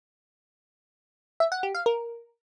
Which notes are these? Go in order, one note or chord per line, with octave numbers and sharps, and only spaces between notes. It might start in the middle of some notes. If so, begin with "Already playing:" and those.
E5
F#5
G4
F5
A#4